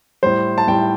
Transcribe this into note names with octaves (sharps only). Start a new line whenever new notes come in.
A2 G3 C5
A5
A2 G3 G5